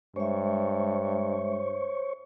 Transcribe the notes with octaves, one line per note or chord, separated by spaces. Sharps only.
G2 G#3 C5 C#5 E5 C#6